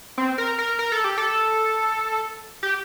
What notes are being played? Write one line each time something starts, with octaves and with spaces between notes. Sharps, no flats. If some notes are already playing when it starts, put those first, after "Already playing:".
C4
A#4
A#4
A#4
A4
G4
A4
G4